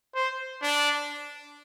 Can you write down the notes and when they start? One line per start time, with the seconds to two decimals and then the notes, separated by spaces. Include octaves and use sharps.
0.15 C5
0.62 D4